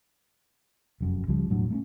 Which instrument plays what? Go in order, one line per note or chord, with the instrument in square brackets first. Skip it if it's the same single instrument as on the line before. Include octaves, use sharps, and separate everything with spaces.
[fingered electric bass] F1 F#2
C#2 C#3 F3 G3
E1 A2 F#3 D4
A3 A#3 C#4